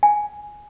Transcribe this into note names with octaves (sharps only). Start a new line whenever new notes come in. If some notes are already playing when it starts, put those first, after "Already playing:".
G#5